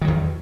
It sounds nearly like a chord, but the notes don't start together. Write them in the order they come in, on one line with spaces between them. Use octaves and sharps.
D#3 F#3 E2